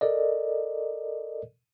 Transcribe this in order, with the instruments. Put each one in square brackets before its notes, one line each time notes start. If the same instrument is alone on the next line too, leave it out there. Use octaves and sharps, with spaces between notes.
[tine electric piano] A4 A#4 D5 D#5